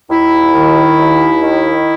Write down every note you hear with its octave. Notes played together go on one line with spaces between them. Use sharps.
D#2 E4
D#3
D#2
D#3